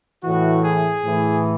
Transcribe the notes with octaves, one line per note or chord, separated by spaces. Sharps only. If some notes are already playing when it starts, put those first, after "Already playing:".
A2 E3 F#4
G#4
A2 E3